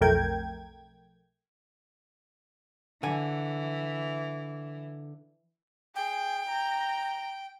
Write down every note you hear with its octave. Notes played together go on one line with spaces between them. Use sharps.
B1 F2 A3 A#4 G5 G#6
D3 E3 G#5
G#4 G5
A#5